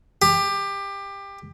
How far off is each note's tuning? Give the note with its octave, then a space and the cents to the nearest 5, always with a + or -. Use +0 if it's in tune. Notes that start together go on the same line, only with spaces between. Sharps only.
G4 +20